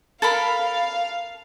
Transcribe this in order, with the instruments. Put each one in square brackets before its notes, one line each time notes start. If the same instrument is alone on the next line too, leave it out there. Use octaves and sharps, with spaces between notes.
[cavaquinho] A4 A#4 B5 [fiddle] F5